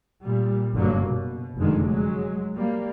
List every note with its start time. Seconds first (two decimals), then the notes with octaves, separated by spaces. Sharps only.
0.22 A#2 G3
0.73 F#1 G2 D3 F#3 A#3
1.04 B2
1.57 F1 F#2 D3 D#3 G#3
1.86 F#3 G#3
2.55 G3 A#3